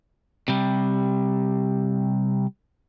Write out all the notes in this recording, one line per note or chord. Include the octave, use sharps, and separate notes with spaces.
C3 G3